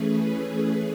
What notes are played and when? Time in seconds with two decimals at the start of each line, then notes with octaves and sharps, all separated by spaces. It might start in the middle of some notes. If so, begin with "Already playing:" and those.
Already playing: E3 A3 C#4 G#4 B4